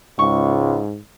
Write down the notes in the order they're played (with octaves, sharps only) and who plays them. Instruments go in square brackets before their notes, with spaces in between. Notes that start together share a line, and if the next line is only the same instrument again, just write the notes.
[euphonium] C#2 [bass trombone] G#2 [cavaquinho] C#6